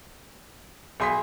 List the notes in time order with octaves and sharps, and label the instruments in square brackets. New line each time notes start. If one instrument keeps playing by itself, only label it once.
[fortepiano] B1 G#4 [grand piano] G#5 C6 B6